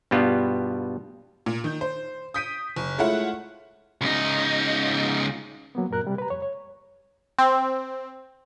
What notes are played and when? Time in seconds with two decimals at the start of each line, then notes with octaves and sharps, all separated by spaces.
0.11 G2 B2 G3 B3 F4
1.46 A#2
1.64 D#3 G6
1.81 C5
2.34 D#6 G6 B6 D7 D#7
2.76 F#1
2.98 G#3 A3 E4 F4 C#5 F#5
4.01 C#2 D#4
5.75 F#3 A#3 B3
5.91 F#2 A#2 A#4 F#6
6.05 C3 G3
6.18 B4 A#5
6.30 F2 C#5
6.42 C#5
7.39 C4